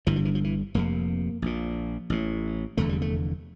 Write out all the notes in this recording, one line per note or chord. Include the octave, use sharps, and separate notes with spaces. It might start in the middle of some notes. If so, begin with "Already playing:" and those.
G1 G2 D3 E3
F3
E3
F3
E3
F1 F2 C3 A#3
A#1 A#2
A1 A2
F1 E2 D3 A3
G3
A3